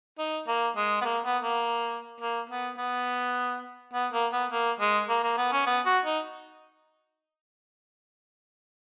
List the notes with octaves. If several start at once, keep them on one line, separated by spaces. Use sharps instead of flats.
D#4
A#3
G#3
B3
A#3
B3
A#3
A#3
B3
B3
B3
A#3
B3
A#3
G#3
A#3
A#3
B3
C#4
B3
F#4
D#4